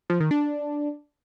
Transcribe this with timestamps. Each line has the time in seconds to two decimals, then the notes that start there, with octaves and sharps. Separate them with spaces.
0.10 F3
0.20 D#3
0.31 D4